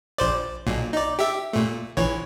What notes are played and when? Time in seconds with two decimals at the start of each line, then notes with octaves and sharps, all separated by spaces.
0.18 A#1 C5 D5
0.67 B1 A#2
0.93 D#4 D5
1.19 G4 E5
1.53 A#2 A3
1.97 A#1 E3 C#5